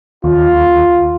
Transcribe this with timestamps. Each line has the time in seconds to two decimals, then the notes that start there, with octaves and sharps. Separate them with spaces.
0.24 D#2 F4